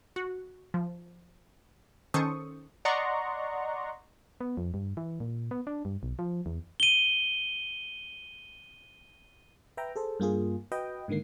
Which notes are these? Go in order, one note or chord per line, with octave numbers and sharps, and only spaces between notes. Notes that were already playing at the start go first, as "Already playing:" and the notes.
F#4
F3
D#3 C#4 A4 C5 C#6 D#6
D5 D#5 F#5 A#5 C6 C#6
B3
F2
G2
E3
A#2
B3
D4
G2
B1
F3
E2
D#7 G7
B4 E5 G5 A#5
G#4 A4 C5
G2 A#3 F4 G#4
F#4 B4 D#5 G5
G#2 D3 D#3 A#3 C7